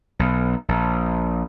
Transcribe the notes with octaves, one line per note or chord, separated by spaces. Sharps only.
B1
A#1